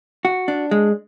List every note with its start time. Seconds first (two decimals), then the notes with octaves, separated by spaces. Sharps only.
0.25 F#4
0.48 D4
0.71 G#3